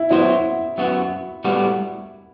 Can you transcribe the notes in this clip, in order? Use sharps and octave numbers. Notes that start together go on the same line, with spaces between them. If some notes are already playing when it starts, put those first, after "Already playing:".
Already playing: E4
F#3 B3 E4 F#4 C5
F#2 F#3 B3 F#4
A2 G3 B3 F#4